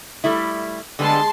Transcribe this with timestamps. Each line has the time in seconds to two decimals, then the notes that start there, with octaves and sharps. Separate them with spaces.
0.24 G3 A3 E4
0.99 D3 G3 G#3 B3 A5 C6